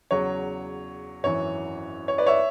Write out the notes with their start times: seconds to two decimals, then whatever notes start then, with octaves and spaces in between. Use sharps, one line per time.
0.11 E2 C#3 F#3 C#5
1.23 G#1 F#2 E3 C#5
2.08 C#5
2.18 B4 D5
2.27 C#5 E5